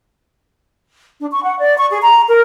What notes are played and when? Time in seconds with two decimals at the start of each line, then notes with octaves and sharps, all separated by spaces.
1.20 D4
1.31 C#6
1.44 F#5
1.59 D5
1.77 C#6
1.89 G#4
2.02 A#5
2.28 A#4